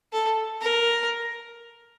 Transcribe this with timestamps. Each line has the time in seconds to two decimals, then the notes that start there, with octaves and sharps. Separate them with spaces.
0.13 A4
0.61 A#4